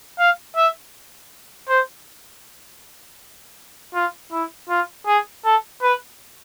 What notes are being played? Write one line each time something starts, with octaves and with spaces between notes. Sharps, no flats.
F5
E5
C5
F4
E4
F4
G#4
A4
B4